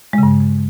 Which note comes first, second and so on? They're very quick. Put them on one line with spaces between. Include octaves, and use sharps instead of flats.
G#3 C#3 G2